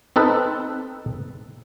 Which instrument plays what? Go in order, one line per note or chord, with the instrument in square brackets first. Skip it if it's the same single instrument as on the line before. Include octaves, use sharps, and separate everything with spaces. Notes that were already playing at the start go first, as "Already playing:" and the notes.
[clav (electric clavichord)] C4 D#4 A4 B4